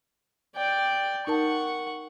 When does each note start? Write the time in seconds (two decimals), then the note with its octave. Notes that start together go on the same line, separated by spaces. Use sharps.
0.56 D5 G5
1.27 D#4 A#4 F#5 A5 C#6